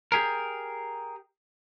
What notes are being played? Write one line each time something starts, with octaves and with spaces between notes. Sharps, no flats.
G4 G#4 A#4